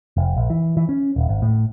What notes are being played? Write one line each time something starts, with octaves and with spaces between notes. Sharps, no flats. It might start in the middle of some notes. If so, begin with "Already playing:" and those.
F1
A#1
E3
E3
C#4
D#1
G#1
A2